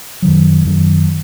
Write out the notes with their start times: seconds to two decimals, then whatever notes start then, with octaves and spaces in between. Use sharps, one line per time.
0.22 F#2 D#3 F#3
0.65 F#2 D#3 F#3